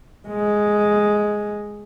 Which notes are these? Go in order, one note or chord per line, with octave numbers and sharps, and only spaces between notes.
G#3